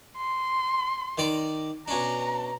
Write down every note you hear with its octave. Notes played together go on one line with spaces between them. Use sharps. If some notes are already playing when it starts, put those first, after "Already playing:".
C6
D#3 D5 A#5
B2 C#4 D4 A#5